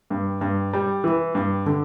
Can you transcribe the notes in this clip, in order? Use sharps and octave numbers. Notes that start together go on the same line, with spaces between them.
G2
G2
G3
E3
G2
D3